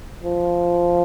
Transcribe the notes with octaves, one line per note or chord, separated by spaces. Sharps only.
F3